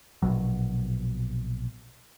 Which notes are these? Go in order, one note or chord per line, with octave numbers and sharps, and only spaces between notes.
A#1 B2 F#3